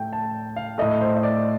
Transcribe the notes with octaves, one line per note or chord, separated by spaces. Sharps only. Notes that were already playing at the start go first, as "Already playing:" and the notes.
Already playing: A2 A3 G5
A5
F5
A2 A3 D#5
C5
D#5
D5